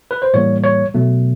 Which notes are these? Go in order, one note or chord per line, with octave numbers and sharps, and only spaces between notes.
B4
C5
A2 E3 G3 A#3 C#5
C#5
B2 F#3 A3